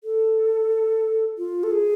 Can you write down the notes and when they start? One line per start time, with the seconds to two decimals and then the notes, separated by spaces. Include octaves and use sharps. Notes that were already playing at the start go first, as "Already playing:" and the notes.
0.04 A4
1.38 F4
1.63 A4
1.71 G#4